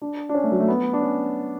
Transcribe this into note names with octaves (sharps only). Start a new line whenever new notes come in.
D4
D4
C#4
A3
F#3
A3
B3
D4
C#4